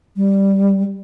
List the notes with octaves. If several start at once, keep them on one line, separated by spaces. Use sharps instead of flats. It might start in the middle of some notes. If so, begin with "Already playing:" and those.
G3